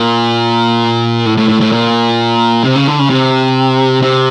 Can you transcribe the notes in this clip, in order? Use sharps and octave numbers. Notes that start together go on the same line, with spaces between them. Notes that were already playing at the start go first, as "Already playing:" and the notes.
Already playing: A#2
A2
A2
A2
A2
A#2
C3
C#3
D3
C#3
C3
C3